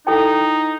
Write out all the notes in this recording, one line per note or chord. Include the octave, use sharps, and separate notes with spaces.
D#4 E4 A4 D5 G5